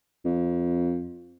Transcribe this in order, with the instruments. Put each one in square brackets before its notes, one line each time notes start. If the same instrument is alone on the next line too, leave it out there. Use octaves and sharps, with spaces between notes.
[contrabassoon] F2